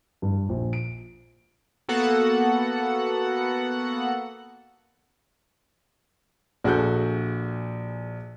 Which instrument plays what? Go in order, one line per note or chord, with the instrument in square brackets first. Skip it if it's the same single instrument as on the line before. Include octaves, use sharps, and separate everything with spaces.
[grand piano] G2
A#1
D7
[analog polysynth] A#3 B3 F#4 A4 F#5
[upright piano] A#1 F#4 G#4 A4 F#6 G6